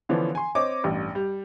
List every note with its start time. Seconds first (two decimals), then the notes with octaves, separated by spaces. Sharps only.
0.09 D3 E3 F3 B3 C#4 D4
0.35 G#5 C6
0.55 C4 C#5 D#5 D6
0.84 A1 G2
1.15 G3